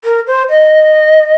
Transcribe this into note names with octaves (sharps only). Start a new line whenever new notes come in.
A#4
C5
D#5